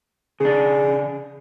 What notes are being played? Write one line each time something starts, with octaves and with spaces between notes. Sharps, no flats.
C#3 D4 G#4